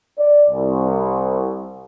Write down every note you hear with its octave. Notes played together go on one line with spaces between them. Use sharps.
D5
C2